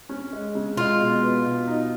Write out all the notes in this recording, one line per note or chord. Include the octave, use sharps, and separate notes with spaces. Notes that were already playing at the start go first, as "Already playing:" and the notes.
C#4
G#3
C#3
G#3 F4
B2
B3
B2
D#4